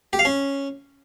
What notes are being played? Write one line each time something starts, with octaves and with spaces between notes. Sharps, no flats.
G4
F5
C#4